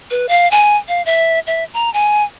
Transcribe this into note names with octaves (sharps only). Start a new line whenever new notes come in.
B4
F5
G#5
F5
E5
E5
A#5
G#5